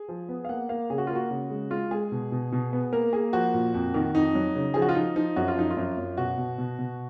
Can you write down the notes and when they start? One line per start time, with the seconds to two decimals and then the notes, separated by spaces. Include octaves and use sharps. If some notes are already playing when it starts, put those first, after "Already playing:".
Already playing: G#4
0.09 F3
0.29 B3
0.45 F5
0.49 A#3 F#5
0.69 A#3 F5
0.90 C#3 G#4
0.98 F#4
1.07 A#3 F4
1.15 F#4
1.31 C#3
1.50 G#3
1.71 G#3 F4
1.91 G#3 G#4
2.12 B2
2.32 B2
2.52 B2
2.73 B3
2.92 A#3 A#4
3.13 A#3 G#4
3.33 F3 F#4
3.54 A#2
3.74 F2
3.94 D#3
4.15 F2 D#4
4.35 F#3
4.55 C#3
4.74 F3 G#4
4.82 F#4
4.89 F4
4.95 F3 D#4
5.16 F3 D#4
5.36 F#2 F#4
5.48 F4
5.57 F3 D#4
5.70 F4
5.77 F#2
5.98 F#2
6.17 B2 F#4
6.38 B2
6.58 B2
6.79 B2